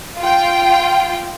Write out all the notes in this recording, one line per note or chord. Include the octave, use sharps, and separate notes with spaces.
F4 G5